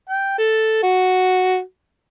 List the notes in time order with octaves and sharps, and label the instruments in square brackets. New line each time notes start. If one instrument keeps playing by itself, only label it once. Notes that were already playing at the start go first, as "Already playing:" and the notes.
[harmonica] G5
A4
F#4